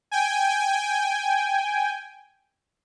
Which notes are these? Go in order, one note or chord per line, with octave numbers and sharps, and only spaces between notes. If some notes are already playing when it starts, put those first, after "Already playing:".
G5 G#5